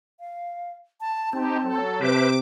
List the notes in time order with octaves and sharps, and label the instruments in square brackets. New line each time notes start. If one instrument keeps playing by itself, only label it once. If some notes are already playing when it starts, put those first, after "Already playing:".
[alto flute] F5
A5
[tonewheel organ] C4 [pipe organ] D#4 G4 [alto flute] A5
[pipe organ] F#3 A4
[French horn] C3 [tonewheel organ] B4 C5 E5 [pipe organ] D6